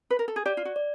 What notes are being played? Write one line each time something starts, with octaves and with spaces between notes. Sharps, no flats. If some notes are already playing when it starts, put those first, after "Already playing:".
B4
A#4
A4
G#4
G4 D5
F4
F#4
D5